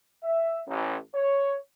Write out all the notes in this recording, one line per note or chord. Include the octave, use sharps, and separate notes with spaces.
E5
A1
C#5